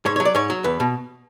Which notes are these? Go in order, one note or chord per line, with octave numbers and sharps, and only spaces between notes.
G#2 C#5
C#5
F#3
D5
G#2 C#5
F#3
E2 B4
B2